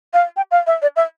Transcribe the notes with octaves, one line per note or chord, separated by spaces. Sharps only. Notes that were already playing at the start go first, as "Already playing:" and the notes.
F5
G5
F5
E5
D5
E5